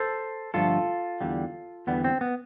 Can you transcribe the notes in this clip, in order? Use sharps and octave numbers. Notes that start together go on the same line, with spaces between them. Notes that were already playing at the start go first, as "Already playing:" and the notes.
Already playing: A4 C5
G2 D3 F3 A3 F4 A4
E2 D3 G3
E2 D3 G3 B3
C4
B3